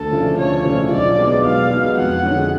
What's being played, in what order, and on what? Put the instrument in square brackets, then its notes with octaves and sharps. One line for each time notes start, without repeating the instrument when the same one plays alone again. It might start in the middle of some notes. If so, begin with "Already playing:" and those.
Already playing: [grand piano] D2 [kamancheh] A4
[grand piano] C#3 F3 A3 D4
[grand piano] D2 [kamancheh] C#5
[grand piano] C#3 F3 A3 D4
[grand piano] B1 [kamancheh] D5
[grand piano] B2 G#3 B3 F#4
[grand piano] B1 [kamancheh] F5
[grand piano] B2 G#3 B3 F#4
[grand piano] F2 [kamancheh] F#5
[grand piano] D3 G#3 C#4 F#4